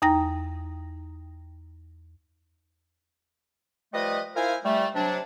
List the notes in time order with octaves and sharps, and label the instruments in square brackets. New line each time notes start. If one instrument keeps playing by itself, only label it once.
[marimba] E2 D#4 G5 A#5 A#6
[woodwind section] F3 G3 A3 B4 D#5
E4 F4 A#4 C5 F5 G#5
G3 A3
C3 F#3 D4